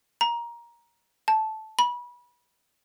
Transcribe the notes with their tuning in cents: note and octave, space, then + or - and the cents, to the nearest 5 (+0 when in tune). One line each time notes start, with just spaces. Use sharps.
A#5 +15
A5 -10
B5 -30